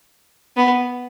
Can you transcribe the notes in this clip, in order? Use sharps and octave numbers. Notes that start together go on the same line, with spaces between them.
B3